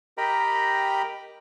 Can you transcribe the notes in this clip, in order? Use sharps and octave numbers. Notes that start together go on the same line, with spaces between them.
G4 A#4 D#5 G5 A#5 B5